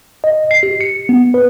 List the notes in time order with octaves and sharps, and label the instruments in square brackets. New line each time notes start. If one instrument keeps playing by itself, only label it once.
[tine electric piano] D#5
C7
G4
C#7
B3
B4